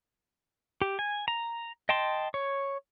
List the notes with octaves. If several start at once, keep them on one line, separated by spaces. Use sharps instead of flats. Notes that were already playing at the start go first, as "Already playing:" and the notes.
G4
G#5
A#5
D#5 G5 A5 C6
C#5